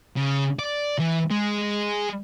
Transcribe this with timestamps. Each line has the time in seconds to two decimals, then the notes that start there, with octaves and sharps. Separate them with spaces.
0.16 C#3
0.59 D5
0.99 E3
1.31 G#3